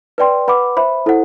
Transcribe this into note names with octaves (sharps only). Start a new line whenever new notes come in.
B4 D5 G5 C6
B4 F#5 B5 D6
C5 E5 B5
E4 A4 C5 F#5